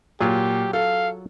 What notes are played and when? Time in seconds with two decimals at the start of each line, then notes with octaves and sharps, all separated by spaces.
0.21 A#2 F#3 F4 G4 G#4
0.73 A4 F5